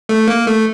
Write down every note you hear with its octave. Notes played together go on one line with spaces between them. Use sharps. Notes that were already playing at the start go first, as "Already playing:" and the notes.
A3
A#3
A3